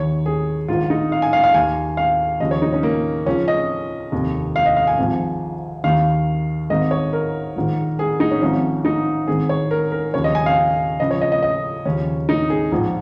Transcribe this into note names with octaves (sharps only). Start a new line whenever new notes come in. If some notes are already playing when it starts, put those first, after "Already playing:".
Already playing: D#2 D#3 C#5
G#4
A#1 G#2 D#3 F4
D#4
F5
G#5
F5
F5
D#2 D#3 G#5
F5
D#2 C#3 F3 D#5
C#5
D#4
C#4
A#3
C#2 C#3 F3 C#4
D#5
F1 D#2 D#3
F5
D#5
F5
G#5
G#1 G#2 F3
D#2 D#3 F5
G#1 G#2 D#3 D#5
C#5
A#4
A#1 G#2 D#3
G#4
D#4
C#4
G#1 G#2 F3 C#4
D#4
G#1 G#2 D#3 G#4
C#5
A#4
A#4
D#2 C#3 F3 C#5
D#5
G#5
F5
C#2 C#3 F3 D#5
C#5
D#5
D#5
D#5
D#2 C#3 F3 C#4
D#4
G#4
A#1 G#2 F3